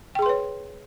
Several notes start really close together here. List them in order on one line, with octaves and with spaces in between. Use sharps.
G5 G#4 C6 B4 C#5